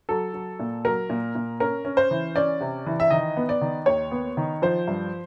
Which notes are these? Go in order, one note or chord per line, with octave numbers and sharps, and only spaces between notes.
F#3 A4
F#3
A#2
F#3 A#4
A#2
A#2
C#4 A#4
C#4
C5
E3
C#4 D5
C3
E3
E5
D#3 D#5
B3
D5
D#3
D#2 C#5
B3
D#3
F3 C5
G2